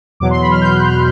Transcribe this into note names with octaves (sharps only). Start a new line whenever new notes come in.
E2 B2 F#3 D6
C6
B5
F6
G6
F#6
F6